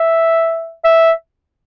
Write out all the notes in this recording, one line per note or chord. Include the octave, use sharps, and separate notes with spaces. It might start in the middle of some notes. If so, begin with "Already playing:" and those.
Already playing: E5
E5